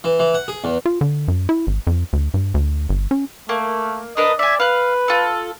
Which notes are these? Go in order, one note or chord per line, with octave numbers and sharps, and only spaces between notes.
E3
E3
F#5
G#4
E2
F4
D3
F#2
E4
G#1
F2
D2
G2
D2
G1
C#4
A3 A#3
D4 A#4 B4 D#5
D5 E5 G#5
B4 F5 F#6
F4 A4